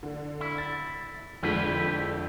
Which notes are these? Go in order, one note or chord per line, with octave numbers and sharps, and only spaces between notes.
D3
E4
A6
F2 D3 G#3 E4 G4 B4